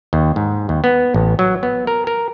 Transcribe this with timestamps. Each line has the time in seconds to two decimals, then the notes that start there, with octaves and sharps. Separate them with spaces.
0.13 D#2
0.36 G#2
0.69 D#2
0.84 B3
1.14 A1
1.39 F#3
1.63 B3
1.87 A#4
2.07 A#4